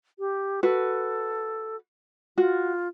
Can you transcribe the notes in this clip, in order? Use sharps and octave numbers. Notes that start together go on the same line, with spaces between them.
G4
F#4 A4 B4
F4 F#4